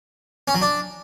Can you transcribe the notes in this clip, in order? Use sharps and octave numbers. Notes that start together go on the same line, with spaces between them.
C#4
F#3
D4